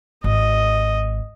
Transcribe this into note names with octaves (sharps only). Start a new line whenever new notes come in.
G#1 D#5